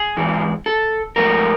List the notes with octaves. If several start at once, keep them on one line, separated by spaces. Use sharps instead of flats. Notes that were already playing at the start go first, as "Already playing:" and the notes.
Already playing: G#4
G#2 E3 G#3
A4
G#2 F3 A3 A#4